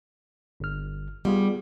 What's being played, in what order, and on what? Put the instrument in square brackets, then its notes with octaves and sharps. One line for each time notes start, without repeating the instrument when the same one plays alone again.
[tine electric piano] G1 F6
[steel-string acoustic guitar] G3 [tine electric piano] B3 F4 G#4